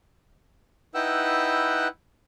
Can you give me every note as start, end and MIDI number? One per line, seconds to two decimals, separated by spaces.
0.94 1.88 63
0.94 1.88 64
0.94 1.88 71
0.94 1.88 78
0.94 1.88 79
0.94 1.88 88